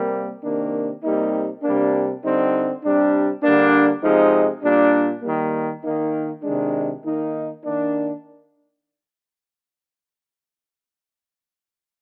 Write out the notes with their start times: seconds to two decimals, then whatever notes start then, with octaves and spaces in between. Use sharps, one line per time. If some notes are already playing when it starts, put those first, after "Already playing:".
Already playing: C3 G3 A#3
0.44 C3 D#3 A#3 D4
1.03 C3 G3 A#3 D#4
1.63 C3 G3 A#3 D4
2.23 D3 G3 C4 D#4
2.84 C3 G3 D4
3.43 D3 G3 A#3 D4
4.03 C3 F3 G#3 D#4
4.64 A#2 G3 D4
5.23 D#3 G3 A#3
5.84 D#3 A#3 D#4
6.43 C3 D#3 G#3 D4
7.03 D#3 A#3 D#4
7.64 D#3 A#3 D4